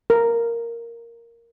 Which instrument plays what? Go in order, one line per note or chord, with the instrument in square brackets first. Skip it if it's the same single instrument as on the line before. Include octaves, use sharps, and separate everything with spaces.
[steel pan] A#4